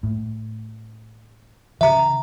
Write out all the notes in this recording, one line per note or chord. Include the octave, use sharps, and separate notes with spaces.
A2
C#3 E3 E5 A#5